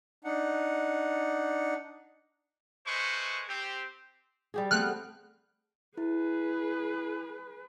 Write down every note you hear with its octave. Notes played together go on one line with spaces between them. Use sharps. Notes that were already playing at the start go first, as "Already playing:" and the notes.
D4 D#4 F#5
G#3 A3 B4 C5 D#5 C#6
C4 G4
G3 G4 G#4
A3 B3 C4 F6 F#6
E4 G#4 B4